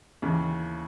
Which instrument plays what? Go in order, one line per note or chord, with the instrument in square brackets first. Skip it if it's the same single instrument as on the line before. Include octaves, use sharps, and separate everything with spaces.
[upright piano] D#2 C#3 E3